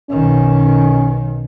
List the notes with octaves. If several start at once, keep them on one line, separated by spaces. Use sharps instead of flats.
B1 D#3 C#4